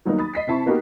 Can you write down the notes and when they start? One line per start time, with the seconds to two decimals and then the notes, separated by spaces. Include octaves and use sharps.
0.05 D#3 F#3 G3 A#3 B3 D#4
0.18 B5 D#6 A6
0.34 D#5 B6 C7
0.47 C3 C4 E4 A5 B5 C#6
0.66 A#3 B3 D#4 F#4 G4 A#4